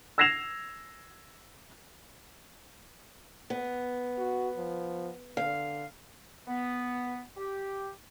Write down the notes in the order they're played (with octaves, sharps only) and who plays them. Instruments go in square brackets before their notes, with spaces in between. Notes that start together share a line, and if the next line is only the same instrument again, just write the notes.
[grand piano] E6 G#6 A#6 C7 E7 F7
[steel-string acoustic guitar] B3
[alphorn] F#4
F3
[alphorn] D3 [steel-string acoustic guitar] F5
[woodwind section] B3
G4